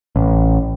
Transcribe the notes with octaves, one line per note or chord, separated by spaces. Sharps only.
A1